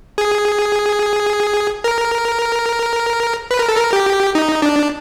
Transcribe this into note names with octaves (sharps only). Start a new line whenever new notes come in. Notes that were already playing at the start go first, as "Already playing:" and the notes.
G#4
A#4
B4
A#4
A4
A#4
G4
D#4
D4